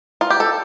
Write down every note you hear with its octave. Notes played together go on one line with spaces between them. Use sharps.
F4
G4
A4